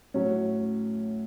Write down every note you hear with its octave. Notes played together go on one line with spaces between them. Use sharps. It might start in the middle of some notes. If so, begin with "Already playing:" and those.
A2 F#3 C#4